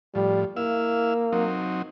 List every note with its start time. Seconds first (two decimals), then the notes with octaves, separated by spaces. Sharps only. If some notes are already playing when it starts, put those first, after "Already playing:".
0.15 A2 F3 G3
0.57 A#3 E4 F5 E6
1.33 F#3 C4 D#4